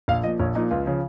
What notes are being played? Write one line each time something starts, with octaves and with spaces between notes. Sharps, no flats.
A#1 F5
A#2 F3 D#5
A#1 C#5
A#2 F3 D#4
C#2 F4
C#3 F3